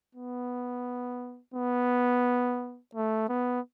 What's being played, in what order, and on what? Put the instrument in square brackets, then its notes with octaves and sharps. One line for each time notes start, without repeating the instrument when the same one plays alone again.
[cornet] B3
B3
A3
B3